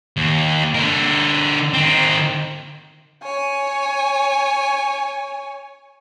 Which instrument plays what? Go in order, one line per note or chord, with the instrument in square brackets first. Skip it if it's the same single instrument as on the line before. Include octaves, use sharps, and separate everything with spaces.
[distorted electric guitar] D#2
D3 A#4
D#3 C4
[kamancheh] C#5 G#5